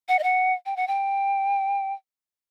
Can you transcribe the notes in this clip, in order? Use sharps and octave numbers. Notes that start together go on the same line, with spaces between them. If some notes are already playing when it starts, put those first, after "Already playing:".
F#5
D#5
F#5
G5
F#5
G5